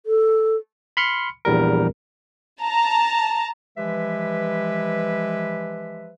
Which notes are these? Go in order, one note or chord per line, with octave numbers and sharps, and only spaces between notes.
A4
B5 C6 F6 C#7
A#1 E2 G3 A#4
A5 A#5
E3 F3 G#3 G4 B4 E5